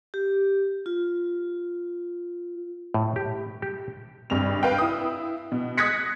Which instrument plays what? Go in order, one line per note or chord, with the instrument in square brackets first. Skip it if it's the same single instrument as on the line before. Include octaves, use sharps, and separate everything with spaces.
[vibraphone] G4
F4
[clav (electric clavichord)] A2
G4
G4
[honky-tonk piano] G#1 G2 C3 F7
B4 F5 G5
E4 D#6
B2
D#6 F#6 G#6 A#6 B6 C#7